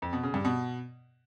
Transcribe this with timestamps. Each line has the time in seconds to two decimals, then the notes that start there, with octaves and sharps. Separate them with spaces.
0.02 F2
0.13 B2
0.23 C#3
0.34 G2
0.45 B2